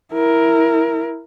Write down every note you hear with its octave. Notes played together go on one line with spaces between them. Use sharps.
E4 A#4